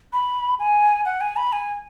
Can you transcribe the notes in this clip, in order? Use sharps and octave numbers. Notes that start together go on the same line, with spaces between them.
B5
G#5
F#5
G#5
B5
G#5